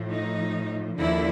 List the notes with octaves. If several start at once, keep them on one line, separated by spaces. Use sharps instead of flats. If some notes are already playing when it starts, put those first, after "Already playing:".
Already playing: A2 F3
D#4
D#2 D3 F3 E4